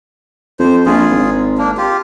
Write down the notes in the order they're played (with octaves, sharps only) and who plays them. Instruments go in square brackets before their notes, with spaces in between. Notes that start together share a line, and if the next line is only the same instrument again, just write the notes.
[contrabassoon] F2 [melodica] C5
[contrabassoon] A#1 [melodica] F4 G#4
[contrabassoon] G#1
[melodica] A#3 D4
F4 G4